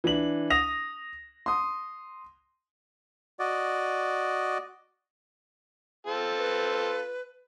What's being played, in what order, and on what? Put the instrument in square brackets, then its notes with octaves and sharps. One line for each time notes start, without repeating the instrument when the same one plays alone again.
[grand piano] E3 D4 F#7
D#6 A#6 F7
C6 D#6
[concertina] F#4 D5 D#5
[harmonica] C4 F4 A4
[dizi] B4